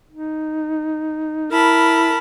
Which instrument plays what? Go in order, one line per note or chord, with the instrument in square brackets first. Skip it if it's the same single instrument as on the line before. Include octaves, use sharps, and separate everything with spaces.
[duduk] D#4
[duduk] E4 [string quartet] A#4 A5 B5